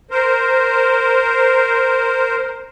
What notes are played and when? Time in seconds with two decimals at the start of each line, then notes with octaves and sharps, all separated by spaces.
0.11 A#4 C5